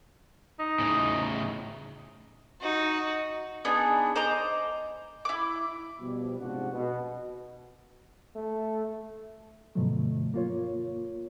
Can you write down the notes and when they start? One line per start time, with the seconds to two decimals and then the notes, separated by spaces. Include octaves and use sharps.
0.59 D#4
0.79 A2 C#3
2.60 D#4 F#4
3.65 B3 D4 D#4 G#4
4.16 C5 D#5 A#5 D6
5.25 E4 D6
6.00 B2 F3 G3
6.39 G#2 C3 F3 D4 F#4 F#5
6.72 B2
8.36 A3
9.75 G2 B2 D3 F3 F#3 A3
10.34 A#3 F4 C#5